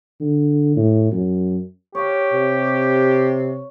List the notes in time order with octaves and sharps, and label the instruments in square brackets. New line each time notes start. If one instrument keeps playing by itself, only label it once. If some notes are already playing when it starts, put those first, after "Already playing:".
[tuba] D3
A2
F#2
[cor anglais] G4 [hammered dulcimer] C#5 F5
[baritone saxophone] C3